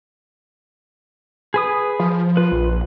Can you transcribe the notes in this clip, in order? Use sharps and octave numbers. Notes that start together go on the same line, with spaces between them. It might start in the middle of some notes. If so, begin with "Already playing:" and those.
G#4 B4 D#6
F3
F4 B4
A#1